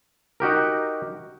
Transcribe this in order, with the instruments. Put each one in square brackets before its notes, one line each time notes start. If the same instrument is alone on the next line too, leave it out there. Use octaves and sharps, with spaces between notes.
[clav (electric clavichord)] D#4 F#4 G4 A#4